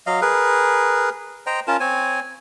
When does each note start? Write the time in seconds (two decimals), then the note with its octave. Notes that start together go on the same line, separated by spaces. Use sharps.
0.06 F#3 D#5 F5
0.22 G#4 A#4 B4
1.46 C5 D#5 G5 A#5
1.67 C#4 F4 A#4 A5
1.80 C4 C#5 G#5